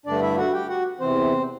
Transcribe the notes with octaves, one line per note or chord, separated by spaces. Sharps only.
G2 D3 A3 D4 D5
E4 E5
F#4 F#5
G4 G5
F#4 F#5
E2 C3 E3 C4 C5